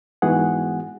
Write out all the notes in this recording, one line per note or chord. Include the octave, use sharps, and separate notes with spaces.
G#2 E3 B3 F#4 G#4 F#5